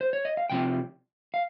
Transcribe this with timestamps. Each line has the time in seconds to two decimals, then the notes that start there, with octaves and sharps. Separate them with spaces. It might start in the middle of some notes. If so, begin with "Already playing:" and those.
0.01 C5
0.13 C#5
0.25 D#5
0.37 F5
0.50 C2 C3 F3 C4 G5
1.34 F5